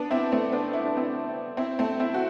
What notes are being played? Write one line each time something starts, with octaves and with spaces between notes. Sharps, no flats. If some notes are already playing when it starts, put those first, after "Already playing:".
Already playing: B3 D4
C4 E4
A3 C4
B3 D4
E4
D4
C4 E4
C4 E4
A3 C4
C4 E4
F#4